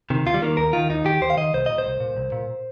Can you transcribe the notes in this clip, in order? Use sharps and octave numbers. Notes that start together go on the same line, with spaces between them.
C3 D#3
D#2 F4
G3
D#3 A#3
D#2 A#4
D#3 F4
D#2 D#4
D#3 G4
D#2 C5
F5
D#3 D#5
C2 C5
A#2 D#5
C5
C2
A#2
C2
A#2